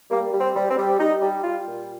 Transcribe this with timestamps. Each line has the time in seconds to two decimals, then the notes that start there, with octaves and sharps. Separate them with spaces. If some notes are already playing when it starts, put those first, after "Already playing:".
0.11 G3 A#3
0.33 G3
0.40 C4
0.56 G3
0.70 C4
0.78 G3
0.99 G3 D#4
1.22 G3
1.44 G3 F4
1.66 A#2